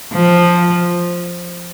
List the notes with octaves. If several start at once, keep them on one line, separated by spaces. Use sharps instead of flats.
F3